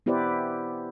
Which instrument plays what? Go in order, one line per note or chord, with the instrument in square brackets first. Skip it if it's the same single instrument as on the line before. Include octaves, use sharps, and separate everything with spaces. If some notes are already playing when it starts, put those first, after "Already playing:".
[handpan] B3 E4 G4 B4 C5 D5